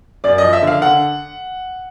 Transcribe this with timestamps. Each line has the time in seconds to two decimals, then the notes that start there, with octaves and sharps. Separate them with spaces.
0.24 F#2 D5
0.38 F3 D#5
0.53 E5
0.62 D3 F5
0.82 D3 F#5